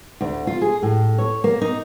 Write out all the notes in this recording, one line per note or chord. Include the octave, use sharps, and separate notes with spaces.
D2
F4
G#4
A2
C#5
A#3
D#4